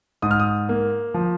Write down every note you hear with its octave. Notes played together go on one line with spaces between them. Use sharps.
G#2 D#6
F6
D#6
A#3
F3